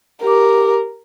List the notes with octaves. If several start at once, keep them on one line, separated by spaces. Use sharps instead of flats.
G4 A#4 D6